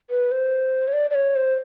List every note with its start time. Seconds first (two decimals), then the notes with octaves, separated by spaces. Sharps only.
0.10 B4
0.31 C5
0.88 C#5
0.93 D5
1.10 D5
1.15 C#5
1.36 C5